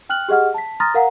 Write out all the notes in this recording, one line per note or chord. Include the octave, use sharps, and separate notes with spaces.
G5 F6 F#6 F#7
G4 G#4 D#5 F#5 F6
A5 B6
A#5 C6 D#6 F6 A6 A#6
A#4 F5 F#5 A#5